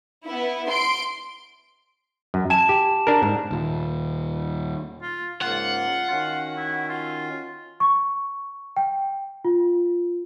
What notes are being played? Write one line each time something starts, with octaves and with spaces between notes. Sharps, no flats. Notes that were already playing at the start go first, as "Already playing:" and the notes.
B3 E4
C6 D7
F#2
G#5 A5 E7
G4
D4 A#4
G#2
D#2 A#2
F4
G#2 C#3 A#3 F4 F#5
D#3 C#4 F#4 F5
E4
F4
C#6
G5
F4